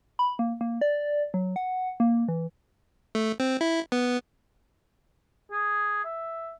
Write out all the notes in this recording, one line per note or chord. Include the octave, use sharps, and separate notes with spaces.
B5
A#3
A#3
D5
F#3
F#5
A#3
E3
A3
C4
E4
B3
G#4
E5